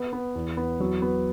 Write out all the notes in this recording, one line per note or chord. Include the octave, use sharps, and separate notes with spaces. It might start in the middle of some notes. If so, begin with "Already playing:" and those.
Already playing: B3
B3
E2
B3
F#3
B3